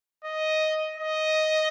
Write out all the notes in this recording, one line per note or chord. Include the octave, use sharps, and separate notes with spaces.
D#5
D#5